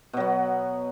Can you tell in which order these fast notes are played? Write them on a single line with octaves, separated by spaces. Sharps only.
B2 F#3 B3